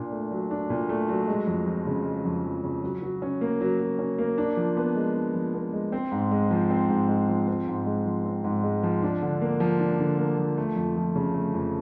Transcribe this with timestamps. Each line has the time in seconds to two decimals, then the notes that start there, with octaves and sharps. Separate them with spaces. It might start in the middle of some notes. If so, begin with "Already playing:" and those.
Already playing: A#2 D4
0.12 A3
0.31 F#3
0.51 D4
0.70 A#2
0.89 A3
1.09 F#3
1.28 G#3
1.47 F2
1.67 F3
1.86 C#3
2.05 G#3
2.25 F2
2.44 F3
2.64 C#3
2.83 F#3
3.02 F#3
3.22 C#4
3.41 A#3
3.61 F#3
3.80 F#3
3.99 C#4
4.18 A#3
4.38 D4
4.57 F3
4.77 B3
4.96 G#3
5.15 D4
5.34 F3
5.54 B3
5.73 G#3
5.92 C4
6.12 G#2
6.31 G#3
6.51 F3
6.70 C4
6.90 G#2
7.09 G#3
7.29 F3
7.48 C4
7.68 G#2
7.86 G#3
8.06 F3
8.25 C4
8.44 G#2
8.64 G#3
8.83 F3
9.03 D4
9.22 D3
9.41 A#3
9.60 F3
9.79 D4
9.99 D3
10.19 A#3
10.38 F3
10.57 A3
10.76 F2
10.96 F3
11.16 C#3
11.34 A3
11.54 F2